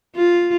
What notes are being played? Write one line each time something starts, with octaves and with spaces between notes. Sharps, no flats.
F4